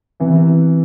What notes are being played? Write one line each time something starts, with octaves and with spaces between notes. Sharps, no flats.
C3 E3 B3